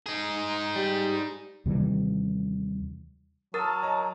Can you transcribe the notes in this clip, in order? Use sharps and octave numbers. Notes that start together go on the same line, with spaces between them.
D#4 G#4
G3
D#2 C3 E3 G3
F#3 A#4 A5 D#6 E6 A6
C#5 D#5 A#5